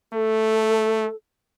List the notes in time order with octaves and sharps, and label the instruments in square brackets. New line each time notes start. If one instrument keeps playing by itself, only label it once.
[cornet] A3 [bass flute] A4